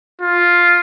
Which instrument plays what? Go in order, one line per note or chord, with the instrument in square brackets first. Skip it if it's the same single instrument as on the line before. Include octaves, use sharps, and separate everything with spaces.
[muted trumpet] F4